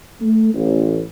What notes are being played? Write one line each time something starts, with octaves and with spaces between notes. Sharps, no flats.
A3
A1